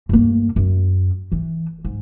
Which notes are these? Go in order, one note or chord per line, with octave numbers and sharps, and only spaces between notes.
G2 A#3
F#2
E3
G#2